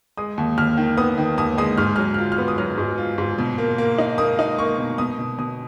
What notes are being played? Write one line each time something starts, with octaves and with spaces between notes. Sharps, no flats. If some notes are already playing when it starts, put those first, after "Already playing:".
G#3 D#6
D#2
D#2 F6
D#3
B3 D#6
D#3
D#2 D#6
G#3 D#6
G#2 F6
F#3 F6
F6
F4
F6
B3
D#6
F#3 F6
G#2
F4
G#2
B2
A#3
A#3
D#4
A#3 D#6
D#4
A#3 C#6
B2
B2 D#6
B2
B2 D#6